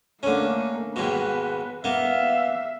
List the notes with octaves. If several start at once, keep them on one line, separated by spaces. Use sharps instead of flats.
D3 A3 A#3 C#4
D#2 G#2 B2 B4
A#3 B3 E5 F5